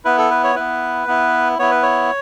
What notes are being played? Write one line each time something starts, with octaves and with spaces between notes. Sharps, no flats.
B3 E4 B4
A4
B4
C#5
B3 E4 B4
B3 E4
B3 E4 C#5
B4
C#5